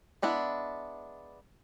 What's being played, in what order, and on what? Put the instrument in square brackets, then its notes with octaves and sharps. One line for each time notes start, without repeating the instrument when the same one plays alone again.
[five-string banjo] G#3 B3 D4 E4